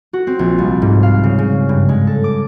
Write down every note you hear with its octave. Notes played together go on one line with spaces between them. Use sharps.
F#4
C4
A#1
C2
G#2
F5
C#3
C#3
G2
G#3
A4
D6